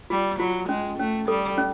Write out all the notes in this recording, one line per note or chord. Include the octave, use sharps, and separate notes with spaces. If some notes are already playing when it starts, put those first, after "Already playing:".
G3 F4
F#3 F4
G#3 C#4
A3 C#4
G3 A4
C#4